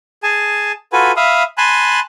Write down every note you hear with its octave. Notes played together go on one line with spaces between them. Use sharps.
G#4 G#5 A5
F4 F#4 A4 B4 G#5 B5
E5 F5 B5 D#6
G#5 A5 B5 C6 F#6